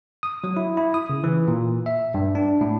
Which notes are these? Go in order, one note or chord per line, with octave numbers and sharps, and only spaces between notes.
D#6
F#3
E4
E4
D#6
C#3
E3
A#2
E5
G2
D4
A2